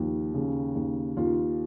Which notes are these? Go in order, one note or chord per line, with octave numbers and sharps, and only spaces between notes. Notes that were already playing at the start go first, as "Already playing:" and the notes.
Already playing: D#2 F3
C#3
D#2
D#2 F4